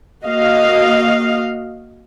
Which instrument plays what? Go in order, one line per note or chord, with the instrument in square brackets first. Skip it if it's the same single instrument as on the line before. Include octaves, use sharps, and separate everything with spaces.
[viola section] A#3 F#4 D#5 F5